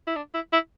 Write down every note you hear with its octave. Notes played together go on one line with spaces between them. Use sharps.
E4
D4
E4
E4